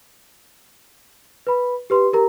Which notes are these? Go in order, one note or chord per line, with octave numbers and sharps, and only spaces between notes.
B4 B5
G4 B4 C6
G4 A#4 A#5